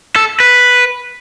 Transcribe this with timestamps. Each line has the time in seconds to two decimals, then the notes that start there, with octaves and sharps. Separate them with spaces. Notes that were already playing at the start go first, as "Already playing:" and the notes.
0.16 A4
0.40 B4